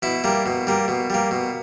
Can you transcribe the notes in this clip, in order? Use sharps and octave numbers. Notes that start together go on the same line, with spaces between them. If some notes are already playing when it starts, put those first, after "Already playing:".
B2 E4
G3 A#3
B2
G3 A#3
B2
G3 A#3
B2